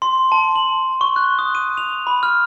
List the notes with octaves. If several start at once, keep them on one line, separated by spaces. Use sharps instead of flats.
C6
A5
F#7
C#6
F#6
D#6
D#7
F7
B5
F6